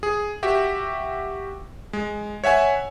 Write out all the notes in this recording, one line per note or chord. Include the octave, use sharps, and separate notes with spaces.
G#4
F#4 G4 E5
G#3
C#5 E5 F#5 G#5